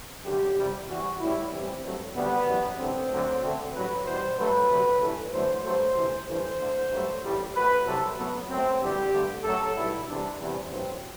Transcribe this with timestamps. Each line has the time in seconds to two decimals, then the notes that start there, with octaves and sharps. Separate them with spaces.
0.24 F#2 D3 G3 G4
0.57 E2 C3 G3
0.88 E2 C3 E3 G3 F#4
1.19 A1 A2 G3 E4
1.51 A1 G2 E3 G3 C4
1.83 G2 F#3 A3
2.15 D2 D3 G3 B3
2.46 F#2 E3 G3
2.78 A1 G2 D3 C4
3.10 D2 D3 F#3 A3
3.41 D2 D3 A3
3.73 A1 G2 F#3 B4
4.05 E2 B2 G3 C5
4.37 G2 F#3 A3 B4
4.69 D2 C3 F#3
5.01 A1 G2 E3 A3
5.31 E2 D3 F#3 A3 C5
5.64 G2 F#3 A3 C5
5.95 D2 C3 E3
6.27 A1 G2 E3 A3 C5
6.59 D2 D3 A3
6.90 G2 F#3 A3
7.22 A1 A2 G3
7.54 F#2 F#3 A3 B4
7.85 C2 C3 F#3 A4
8.17 F#2 F#3 A3 B3
8.48 F#2 F#3 A3 C4
8.81 E2 D3 G3 G4
9.12 G2 D3 A3
9.43 F#2 F#3 A3 A4
9.75 B1 B2 G3 E4
10.07 E2 C3 G3 D4
10.38 E2 C3 E3 G3 C4
10.70 A1 G2 F#3 C4